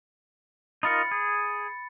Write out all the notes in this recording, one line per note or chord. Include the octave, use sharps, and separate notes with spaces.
D#4 F4 A#4 B5 A6 C#7
G#4